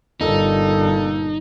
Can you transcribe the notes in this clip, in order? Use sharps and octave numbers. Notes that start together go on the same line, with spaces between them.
G1 A#2 D#4 A4